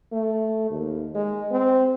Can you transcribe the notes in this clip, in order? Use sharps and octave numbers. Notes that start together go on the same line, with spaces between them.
A3
D#2
G#3
C4